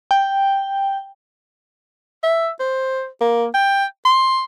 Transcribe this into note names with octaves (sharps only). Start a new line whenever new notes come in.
G5
E5
C5
A#3
G5
C6